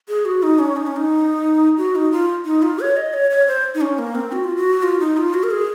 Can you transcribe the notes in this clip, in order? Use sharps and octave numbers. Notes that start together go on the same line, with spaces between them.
G#4
F#4
D#4
C#4
D#4
C#4
D#4
F#4
D#4
F4
D#4
F4
C#5
D#5
C#5
C#5
C5
D#4
C#4
A#3
C4
F#4
F4
F#4
F4
D#4
F4
F#4
A#4
G#4